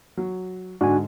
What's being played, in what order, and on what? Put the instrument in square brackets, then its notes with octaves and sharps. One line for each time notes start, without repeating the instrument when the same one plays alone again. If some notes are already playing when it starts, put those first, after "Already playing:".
[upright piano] F#3
[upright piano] G#2 D3 [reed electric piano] D4 [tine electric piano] F#4 G#5